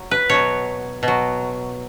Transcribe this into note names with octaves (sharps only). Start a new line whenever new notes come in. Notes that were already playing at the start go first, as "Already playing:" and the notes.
Already playing: F#3
B4
B2 F#3 C#5
B2
F#3